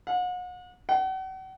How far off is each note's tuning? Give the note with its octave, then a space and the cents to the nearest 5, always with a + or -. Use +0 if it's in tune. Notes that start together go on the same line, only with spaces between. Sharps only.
F#5 -40
F#5 +40